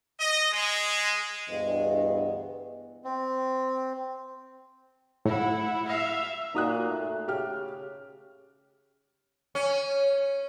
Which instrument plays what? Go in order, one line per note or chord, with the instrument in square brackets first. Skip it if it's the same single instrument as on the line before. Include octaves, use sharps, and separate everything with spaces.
[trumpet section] D#5
G#3
[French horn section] D2 G2 E3 B3 G#4 D#5
[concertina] C4
[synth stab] A2 [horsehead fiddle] E4 F#5
[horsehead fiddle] E5 F5
[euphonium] A#2 [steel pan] D#4 F#4 [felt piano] A#5 D#6 F#6
[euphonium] A3
[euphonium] C#3 [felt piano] G4 F6
[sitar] C#4